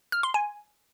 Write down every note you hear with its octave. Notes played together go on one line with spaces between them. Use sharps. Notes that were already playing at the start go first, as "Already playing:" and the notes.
F6
C6
G#5